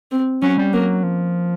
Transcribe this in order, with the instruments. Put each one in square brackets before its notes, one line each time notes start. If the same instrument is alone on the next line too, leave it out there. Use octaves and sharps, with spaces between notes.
[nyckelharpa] C4
[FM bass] F#3 [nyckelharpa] C#4
[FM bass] G3
[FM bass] F#3 [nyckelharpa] A#3
[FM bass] F3